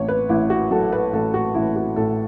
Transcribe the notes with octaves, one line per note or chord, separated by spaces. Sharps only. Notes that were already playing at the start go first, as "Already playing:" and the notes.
Already playing: A1 C#5
B4
A1 E4
F#4
F#3 A4
B4
A1 A4
F#4
A1 E4
F#4
A2 A4